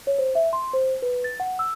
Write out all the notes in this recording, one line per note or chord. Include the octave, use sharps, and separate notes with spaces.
C#5
C5
E5
C6
C5
B4
A6
F#5
E6